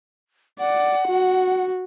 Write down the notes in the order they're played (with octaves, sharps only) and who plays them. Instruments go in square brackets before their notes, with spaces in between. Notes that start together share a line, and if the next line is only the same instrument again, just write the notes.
[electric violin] D5 [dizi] F#5
[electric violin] F#4